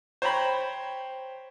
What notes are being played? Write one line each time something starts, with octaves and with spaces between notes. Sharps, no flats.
C5 C#5 G5 A#5 B5